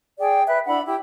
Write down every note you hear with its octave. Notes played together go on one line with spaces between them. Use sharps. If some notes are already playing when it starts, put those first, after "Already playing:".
G#4 D5 G5
B4 E5 F#6
D4 E4 F#5 B5
E4 G4 G5